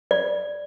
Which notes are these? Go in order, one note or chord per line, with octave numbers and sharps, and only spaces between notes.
D5